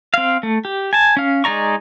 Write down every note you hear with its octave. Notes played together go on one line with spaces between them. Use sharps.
C4 F5
A3
G4
G#5 A5
C#4 F5
G#3 D#4 D5 A#5 C#6